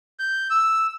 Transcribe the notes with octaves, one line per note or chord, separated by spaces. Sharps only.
G6
E6